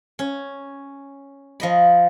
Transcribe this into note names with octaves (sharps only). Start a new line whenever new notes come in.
C#4
F3 D#5 B5